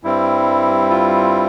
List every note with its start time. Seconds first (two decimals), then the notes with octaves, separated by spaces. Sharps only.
0.03 G2 G3 C4 E4
0.90 F4